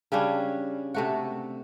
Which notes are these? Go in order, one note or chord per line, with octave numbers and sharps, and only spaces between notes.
C#3 G3 C#4 D4
C3 A3 F#4